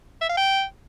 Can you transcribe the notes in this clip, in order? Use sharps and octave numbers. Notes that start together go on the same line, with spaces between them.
E5
F5
G5